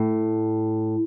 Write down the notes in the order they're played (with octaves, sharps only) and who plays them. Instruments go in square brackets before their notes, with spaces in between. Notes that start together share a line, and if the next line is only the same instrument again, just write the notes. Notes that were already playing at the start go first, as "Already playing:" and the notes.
Already playing: [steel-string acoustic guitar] A2